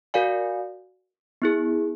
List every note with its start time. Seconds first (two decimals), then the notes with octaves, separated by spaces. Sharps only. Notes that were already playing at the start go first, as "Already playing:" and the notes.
0.14 F#4 A#4 D5 F5 G#5
1.42 B3 E4 G#4